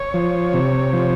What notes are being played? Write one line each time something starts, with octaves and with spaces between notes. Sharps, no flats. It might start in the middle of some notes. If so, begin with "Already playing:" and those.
Already playing: C#5
F3
C3
F3